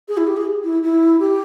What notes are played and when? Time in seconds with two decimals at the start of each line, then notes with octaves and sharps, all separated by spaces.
0.08 G#4
0.17 E4
0.27 G4
0.36 G#4
0.63 E4
0.82 E4
1.19 G4